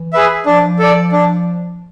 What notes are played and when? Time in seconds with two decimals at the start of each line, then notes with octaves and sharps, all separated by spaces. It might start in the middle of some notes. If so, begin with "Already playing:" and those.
Already playing: E3
0.13 G#4 B4 E5
0.46 F3 D4
0.79 A4 D5
1.12 D4